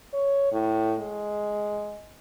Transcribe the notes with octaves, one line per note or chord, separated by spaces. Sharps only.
C#5
A2
G#3